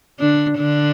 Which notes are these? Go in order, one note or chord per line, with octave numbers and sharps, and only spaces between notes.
D3 D4
D3 D4